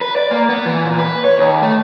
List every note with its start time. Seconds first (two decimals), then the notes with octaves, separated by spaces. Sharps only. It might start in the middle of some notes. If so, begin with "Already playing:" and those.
0.01 B4
0.16 D5
0.31 A#3
0.49 B3
0.66 E3
0.84 A#2
0.99 B4
1.25 C#5
1.38 D#2
1.62 A3